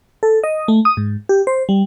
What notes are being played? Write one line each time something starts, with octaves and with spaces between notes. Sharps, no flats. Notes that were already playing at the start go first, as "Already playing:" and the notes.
A4
D#5
A3
D#6
G#2
G4
C5
G3